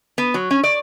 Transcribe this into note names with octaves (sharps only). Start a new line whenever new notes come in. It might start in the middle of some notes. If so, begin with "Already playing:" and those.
B3
F#3
C#4
D5